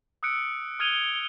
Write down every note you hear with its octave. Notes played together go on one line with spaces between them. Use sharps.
D#6 E6 F#6 C#7 D7
D#6 F6 G#6 D#7 F7 G7